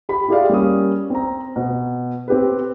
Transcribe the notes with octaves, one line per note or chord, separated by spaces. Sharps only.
G4 B5
E4 F4 G4 G#4 D5 F5
G3 A#3 C#4 D#6
C4 A#5
B2
C4 G4 B4